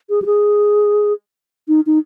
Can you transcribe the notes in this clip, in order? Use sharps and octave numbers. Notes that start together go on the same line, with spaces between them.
G#4
G4
G#4
D#4
D#4